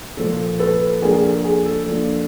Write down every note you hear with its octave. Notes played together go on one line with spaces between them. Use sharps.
A#2 F3 A#3 A4
A4 B4
F3 A#3 D4 F4 G#4 A#4
G#4
A4
G#4
A4
F3 A#3 D4 F4